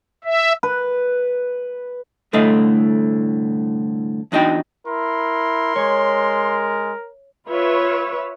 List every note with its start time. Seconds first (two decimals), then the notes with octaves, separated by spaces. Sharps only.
0.24 E5
0.63 B4
2.33 C2 A2 D3 A3 D#5 F5
4.32 E2 D4 D#4 F#4 G5
4.87 E4 A#4 C6
5.76 G#3 C#5 G#6
7.47 F4 B4 C#5 E5